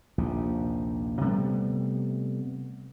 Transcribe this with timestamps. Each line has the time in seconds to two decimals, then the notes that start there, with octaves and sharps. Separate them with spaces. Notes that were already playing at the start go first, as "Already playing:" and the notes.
0.18 A#1 D#2 C3
1.21 C3 G3 A3 B3